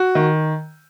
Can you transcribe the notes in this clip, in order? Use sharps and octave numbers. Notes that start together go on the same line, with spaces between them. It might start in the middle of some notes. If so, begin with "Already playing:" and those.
Already playing: F#4
D#3